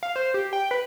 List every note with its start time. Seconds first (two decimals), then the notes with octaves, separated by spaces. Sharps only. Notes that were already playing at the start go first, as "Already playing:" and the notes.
0.03 F5
0.16 C5
0.34 G4
0.53 G5
0.71 B4